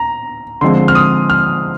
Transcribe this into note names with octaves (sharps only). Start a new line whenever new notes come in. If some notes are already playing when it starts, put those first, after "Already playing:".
Already playing: A#5
D3 F3 G#3 C4 C6
F6
D#6
F6